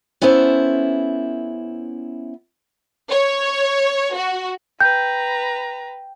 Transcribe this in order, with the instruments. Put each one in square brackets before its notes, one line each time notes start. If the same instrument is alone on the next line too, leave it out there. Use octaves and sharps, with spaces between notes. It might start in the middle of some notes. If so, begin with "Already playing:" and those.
[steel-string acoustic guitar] B3 C#4 E4 A4 C5
[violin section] C#5
F#4
[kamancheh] B4 A#5 [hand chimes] G5 [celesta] G6